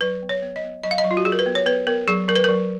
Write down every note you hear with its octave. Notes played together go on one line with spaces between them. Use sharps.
F#3 B4
B3
C#5
B3
D#5
B3
F#3 D#5
F5
D#5
F#3
F4
F#4
F#3 G#4
A#4
B4
B3
C#5
B3 B4
B3 A#4
F#3 G#4
F#3 A#4
B4
F#3 A#4